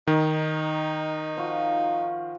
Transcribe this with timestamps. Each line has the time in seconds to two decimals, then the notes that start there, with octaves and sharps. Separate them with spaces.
0.07 D#3 D#4
1.37 F3 F4 F#4